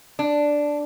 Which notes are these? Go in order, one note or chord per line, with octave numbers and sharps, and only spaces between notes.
D4